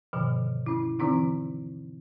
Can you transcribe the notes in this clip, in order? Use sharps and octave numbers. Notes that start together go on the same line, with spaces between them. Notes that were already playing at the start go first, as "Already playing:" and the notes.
G2 B2 D3 D#3 F3
C#4 E4
D3 E3 C4 D#4 E4